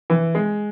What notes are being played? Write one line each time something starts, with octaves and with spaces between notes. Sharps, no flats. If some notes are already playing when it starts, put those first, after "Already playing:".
E3
G#3